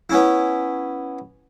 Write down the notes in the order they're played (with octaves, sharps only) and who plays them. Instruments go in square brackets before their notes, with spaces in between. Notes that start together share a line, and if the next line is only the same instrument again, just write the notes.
[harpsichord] B3 C#4 E4